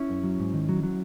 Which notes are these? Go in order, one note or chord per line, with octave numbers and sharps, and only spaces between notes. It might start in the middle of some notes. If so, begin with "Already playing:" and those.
Already playing: C#4 E4
F#2
F#3
G#2
D#3
F#3
F#3